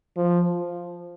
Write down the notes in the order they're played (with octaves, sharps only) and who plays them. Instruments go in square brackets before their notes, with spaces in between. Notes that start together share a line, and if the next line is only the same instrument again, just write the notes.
[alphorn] F3